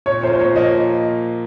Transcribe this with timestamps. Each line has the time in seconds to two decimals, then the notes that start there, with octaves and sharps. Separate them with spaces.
0.06 A#2 C#5
0.23 F3 A#3 F4 C5
0.33 C5
0.39 A#2 C#5
0.56 F3 A#3 F4 D#5